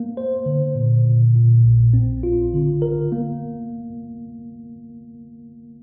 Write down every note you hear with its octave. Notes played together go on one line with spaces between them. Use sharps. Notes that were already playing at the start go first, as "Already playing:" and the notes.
Already playing: A#3
C5
D3
A#2
A#2
A#2
A#1
C4
F4
D3
A#4
A#3